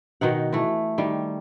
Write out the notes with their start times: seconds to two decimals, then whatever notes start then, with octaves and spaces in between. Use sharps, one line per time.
0.21 B2 D#3 D#4 F#5
0.53 E3 A3
0.98 D#3 G3